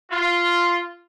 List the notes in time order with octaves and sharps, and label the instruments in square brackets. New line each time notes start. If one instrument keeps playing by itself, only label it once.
[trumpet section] F4